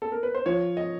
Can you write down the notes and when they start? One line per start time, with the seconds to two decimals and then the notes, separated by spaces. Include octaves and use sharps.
0.02 A4
0.12 A#4
0.23 B4
0.35 C5
0.46 F3 C#5
0.77 D#5